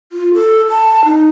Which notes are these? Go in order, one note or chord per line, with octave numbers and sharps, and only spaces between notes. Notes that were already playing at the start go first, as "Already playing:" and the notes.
F4
A4
A5
D#4